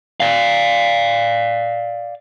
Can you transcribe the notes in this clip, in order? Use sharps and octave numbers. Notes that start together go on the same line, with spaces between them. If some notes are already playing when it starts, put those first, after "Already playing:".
D5 F5